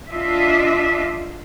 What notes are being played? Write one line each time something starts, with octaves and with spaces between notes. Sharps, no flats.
D4 F4 D#5 E5